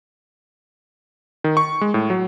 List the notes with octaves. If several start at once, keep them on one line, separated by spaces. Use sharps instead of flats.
D#3
C#6
G#3
A2
F#3